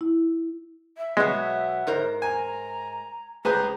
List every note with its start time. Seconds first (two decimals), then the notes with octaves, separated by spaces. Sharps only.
0.01 E4
0.97 E5
1.17 B2 F#3 G#3 B3
1.87 G#2 A#4 C5
2.22 G#5 A#5
3.45 C#2 G#4 B4 C5 A#5